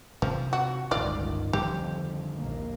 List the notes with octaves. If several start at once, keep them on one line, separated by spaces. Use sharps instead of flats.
C3 F3
F#4
D1 G1 C#2 G2 D#3 F4 D5
F2 D3 D#3 G3 G4
A#1 D#2 A#3